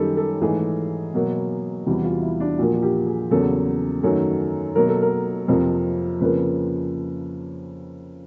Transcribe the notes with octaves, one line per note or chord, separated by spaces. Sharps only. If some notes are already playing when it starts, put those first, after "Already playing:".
Already playing: F#2 D#3 G3 G4 A4
A4
G#2 E3 A3 G#4
B2 F#3 A#3
E2 C3 E3 G3 F#4
F4
E4
D4
A#2 F3 A#3 F#4
F#4
G4
G#4
E2 C#3 F#3 A#3 A4
F#2 D#3 F#3 A3
B2 F#3 A#3 A#4
A4
A#4
F2 C3 F3 A#3
F2 C#3 F3 A#3 B4